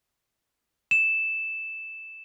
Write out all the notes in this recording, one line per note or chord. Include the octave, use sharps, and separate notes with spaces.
E7